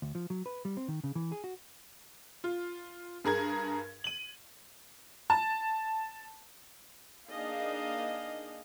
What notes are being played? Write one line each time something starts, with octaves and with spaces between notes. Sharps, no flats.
D2
F3
F#3
B4
G3
C4
D#3
C#3
E3
G#4
F#4
F4
G2 G#4 A#4 G#6
D#7 F#7
A5
A#3 D4 D#4 G#4 D#5 F5